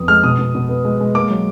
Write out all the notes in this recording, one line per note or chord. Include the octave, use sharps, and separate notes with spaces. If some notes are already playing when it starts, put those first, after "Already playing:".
Already playing: F2 B3 D#6
G#3 F6
B2 D#6
B2
B2
B3
G#3
G#3
A#3 D6
F#3